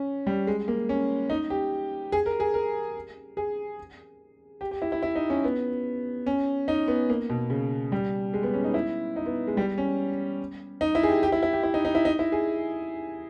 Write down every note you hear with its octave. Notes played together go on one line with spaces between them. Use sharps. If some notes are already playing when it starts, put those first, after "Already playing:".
Already playing: C#4
G3
G#3
A#3
C#4
D#4
G4
G#4
A#4
G#4
A#4
G#4
G4
G4
E4
E4
E4
D#4
C#4
B3
C#4
D#4
B3
A#3
B2
C#3
G3
G#3
B3
C#4
D#4
E4
D#4
B3
G#3
G3
C#4
D#4
E4
G#4
G4
G4
E4
E4
G4
E4
D#4
D#4
E4
D#4
E4
G#4